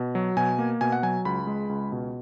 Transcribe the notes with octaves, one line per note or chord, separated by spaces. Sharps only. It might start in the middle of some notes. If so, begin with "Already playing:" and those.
Already playing: B2
F#3
B2 G#5
A#3
B2 G#5
F#5
F#3 G#5
C#2 B5
G#3
C#2
B2